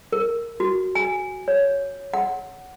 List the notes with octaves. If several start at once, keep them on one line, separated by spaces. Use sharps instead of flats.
A#4
F#4
G#5
C#5
F#5